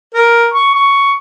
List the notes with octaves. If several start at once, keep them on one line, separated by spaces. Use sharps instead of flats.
A#4
C#6
C#6